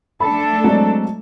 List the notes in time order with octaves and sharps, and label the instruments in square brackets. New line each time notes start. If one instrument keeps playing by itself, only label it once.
[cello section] A3 D4 A4 [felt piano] B5
[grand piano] F#3 [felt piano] G#3 C4 D5